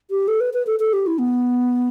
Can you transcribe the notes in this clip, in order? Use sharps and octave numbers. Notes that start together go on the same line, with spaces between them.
G4
A4
B4
B4
A4
A4
G4
E4
B3